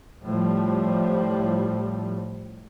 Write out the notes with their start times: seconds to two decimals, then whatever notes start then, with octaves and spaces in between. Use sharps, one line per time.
0.25 A2 F3 G3